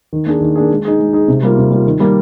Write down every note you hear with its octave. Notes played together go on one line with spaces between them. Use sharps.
D#3
A#3 D4 G#4
D#3
A#3 D4 G#4
G#3
D#4 G#4
G#3
D#4 G#4
C3
G3 A#3 F4
C3
G3 A#3 F4
D#3
G3 A#3